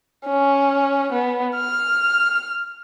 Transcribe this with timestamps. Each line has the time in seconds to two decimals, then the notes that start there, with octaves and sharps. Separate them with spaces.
0.26 C#4
1.12 B3
1.56 F6